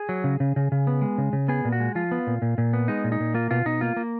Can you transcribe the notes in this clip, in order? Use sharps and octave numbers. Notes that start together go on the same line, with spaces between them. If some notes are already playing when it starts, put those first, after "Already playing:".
Already playing: G#4
F#3
C#3
C#3
C#3
C#3
B3
G#3
C#3
C#3
B3 G#4
A#2
F#4
G#3
F3 F4
B3
A#2
A#2
A#2
B3
G#3 D#4
A#2
D#4
A#2
A#3 F4
B2 F4
B2 D#4
A#3 F4
A#3